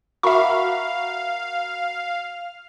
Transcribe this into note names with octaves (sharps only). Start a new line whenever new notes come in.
F#4 A#4 E5 F5 B5 C#6